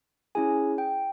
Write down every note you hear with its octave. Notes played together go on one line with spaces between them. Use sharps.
C#4 E4 G#4 G#5
G5